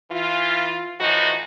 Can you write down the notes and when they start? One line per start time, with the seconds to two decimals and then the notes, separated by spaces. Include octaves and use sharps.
0.11 E3 F4
1.00 A2 E3 F3 D#4 F#4